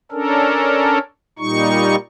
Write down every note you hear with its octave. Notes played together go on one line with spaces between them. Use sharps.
C#4 D4 A4 A#4
A#2 G3 D#4 C#6